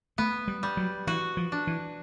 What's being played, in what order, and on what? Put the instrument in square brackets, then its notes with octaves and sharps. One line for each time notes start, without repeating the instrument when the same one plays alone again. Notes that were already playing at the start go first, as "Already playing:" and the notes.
[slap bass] A3 [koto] B3
[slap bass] G3
[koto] G3
[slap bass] F#3
[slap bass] E3 [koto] F#4
[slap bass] F3
[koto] D4
[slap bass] E3